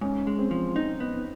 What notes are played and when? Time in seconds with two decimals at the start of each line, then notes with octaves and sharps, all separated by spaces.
0.01 G#2 C#4
0.27 G#3
0.39 C4
0.51 F3
0.76 C4 D#4
1.00 B3